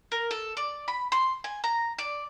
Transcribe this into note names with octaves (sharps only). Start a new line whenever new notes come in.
A#4
A4
D5
B5
C6
G#5
A#5
D5